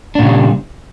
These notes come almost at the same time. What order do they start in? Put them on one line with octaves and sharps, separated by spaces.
D4 A#2 C#3 G3